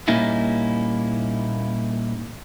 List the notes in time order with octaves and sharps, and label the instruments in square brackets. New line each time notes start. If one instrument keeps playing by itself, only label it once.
[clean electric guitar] A#2 G3 A#3 C#4 D#4 E4